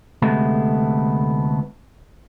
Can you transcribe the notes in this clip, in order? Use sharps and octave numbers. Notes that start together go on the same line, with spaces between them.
D2 C3 G#3 A3 B3